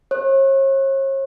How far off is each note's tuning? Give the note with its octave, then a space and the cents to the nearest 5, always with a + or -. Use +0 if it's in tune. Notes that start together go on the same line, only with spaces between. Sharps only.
C#5 -40